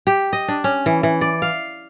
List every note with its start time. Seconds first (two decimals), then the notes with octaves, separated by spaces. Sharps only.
0.07 G4
0.33 D#5
0.48 D4
0.64 C#4
0.86 E3
1.03 E3
1.21 D5
1.42 F5